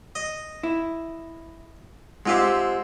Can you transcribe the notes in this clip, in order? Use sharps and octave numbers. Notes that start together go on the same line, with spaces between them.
D#5
E4
G#2 G#3 C4 F4 G4 E5